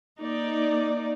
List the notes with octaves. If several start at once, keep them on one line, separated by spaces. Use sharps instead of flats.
A#3 D#4 D5